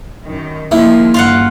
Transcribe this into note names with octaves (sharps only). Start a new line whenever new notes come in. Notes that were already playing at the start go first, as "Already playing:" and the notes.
F#2 D#3
D#3 F3 G#3 A#3 E4
G2 C#3 F4 F5 F#5